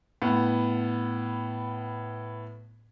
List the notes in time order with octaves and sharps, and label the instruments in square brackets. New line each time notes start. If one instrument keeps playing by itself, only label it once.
[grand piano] A2 B3